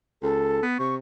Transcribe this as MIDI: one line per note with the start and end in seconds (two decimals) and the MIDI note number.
0.22 0.61 37
0.22 0.63 69
0.63 0.76 59
0.79 0.97 48
0.79 0.95 85